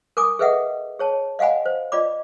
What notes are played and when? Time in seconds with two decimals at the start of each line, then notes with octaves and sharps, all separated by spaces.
0.17 A#4 G#5 D6 D#6
0.39 G#4 A4 B4 D#5 E5 F#5
0.99 G#4 C#5 A5
1.39 D#5 F5 F#5 G#5 B5
1.66 C5
1.92 F4 D5 D#5 B5 D6